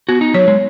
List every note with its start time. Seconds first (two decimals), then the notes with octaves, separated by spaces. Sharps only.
0.09 B3 F#4
0.21 D#4
0.34 F#3 C#5
0.48 G#3